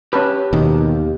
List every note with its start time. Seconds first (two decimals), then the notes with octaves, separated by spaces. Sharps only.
0.13 C#4 G4 B4 A5
0.53 D#2 B2 D#3